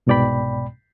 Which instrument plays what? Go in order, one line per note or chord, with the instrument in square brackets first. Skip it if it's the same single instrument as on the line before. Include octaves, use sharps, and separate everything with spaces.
[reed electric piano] C2 G#2 B2 D5 G5 B5